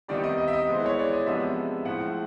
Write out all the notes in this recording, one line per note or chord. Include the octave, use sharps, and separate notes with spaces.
C3 D#3 G3 B3 D#4 D5
D#5
D#5
E5
D#5
E3 G#3 B3 C5
C#5
D5
D#5
C3 F3 G#3 B3 D4 E5
A2 F3 G#3 F#5